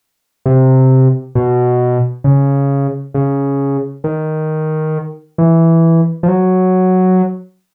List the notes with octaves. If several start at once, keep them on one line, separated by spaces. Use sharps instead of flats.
C3
B2
C#3
C#3
D#3
E3
F3
F#3